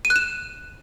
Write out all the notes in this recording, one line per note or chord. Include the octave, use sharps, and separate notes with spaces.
D#7
F#6
E7